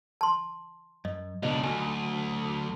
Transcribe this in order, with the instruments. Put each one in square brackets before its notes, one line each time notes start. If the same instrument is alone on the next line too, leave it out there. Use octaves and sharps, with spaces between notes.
[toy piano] A5 C6
[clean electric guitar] F#2 [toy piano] D#5
[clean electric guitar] C#2 B2 [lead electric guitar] F#3 D4 [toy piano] D#5
[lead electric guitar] D2 [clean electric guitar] F#3 [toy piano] G#5